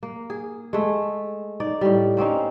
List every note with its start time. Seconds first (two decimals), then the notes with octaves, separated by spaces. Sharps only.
0.03 A#3
0.30 G#4
0.73 G#3 A3
1.60 D#4 D5
1.81 A2 G3
2.17 A#3 C4 C#4 D#4